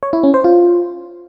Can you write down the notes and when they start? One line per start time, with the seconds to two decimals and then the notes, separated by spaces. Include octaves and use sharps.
0.03 C#5
0.13 E4
0.23 C#4
0.34 C5
0.44 F4